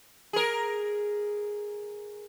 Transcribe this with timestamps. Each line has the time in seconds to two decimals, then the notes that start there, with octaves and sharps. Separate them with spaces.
0.33 G#4 A#4